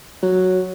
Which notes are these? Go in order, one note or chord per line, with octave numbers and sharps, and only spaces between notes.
F#3